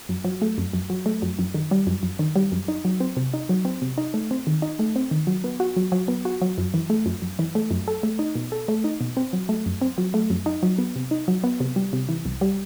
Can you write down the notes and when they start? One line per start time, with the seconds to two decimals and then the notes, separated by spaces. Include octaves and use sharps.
0.09 F#2
0.24 F#3
0.42 A3
0.58 F#2
0.73 F#2
0.90 F#3
1.06 A3
1.22 F#2
1.39 F#2
1.54 D#3
1.71 G3
1.87 F#2
2.03 F#2
2.19 D#3
2.36 G3
2.52 F#2
2.68 D#4
2.85 F#3
3.00 C4
3.17 C3
3.34 D#4
3.49 F#3
3.65 C4
3.82 C3
3.98 D#4
4.14 A3
4.31 C4
4.47 D#3
4.62 D#4
4.79 A3
4.96 C4
5.11 D#3
5.27 F#3
5.44 B3
5.60 F#4
5.77 F#3
5.92 F#3
6.08 B3
6.25 F#4
6.42 F#3
6.58 F#2
6.74 E3
6.90 A3
7.06 F#2
7.22 F#2
7.39 E3
7.55 A3
7.71 F#2
7.88 A4
8.03 A3
8.19 D#4
8.35 B2
8.52 A4
8.68 A3
8.84 D#4
9.01 B2
9.17 C4
9.33 F#3
9.49 A3
9.66 F#2
9.82 C4
9.98 F#3
10.14 A3
10.30 F#2
10.46 D#4
10.63 F#3
10.78 B3
10.96 C3
11.11 D#4
11.28 F#3
11.44 B3
11.60 C3
11.76 G3
11.93 C3
12.09 E3
12.25 C2
12.41 G3